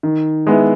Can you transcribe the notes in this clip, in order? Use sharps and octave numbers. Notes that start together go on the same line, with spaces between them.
D#3
G#3 B3 E4